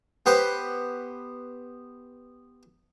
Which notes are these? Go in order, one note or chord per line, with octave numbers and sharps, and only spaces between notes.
B3 G4 B4 C5 B5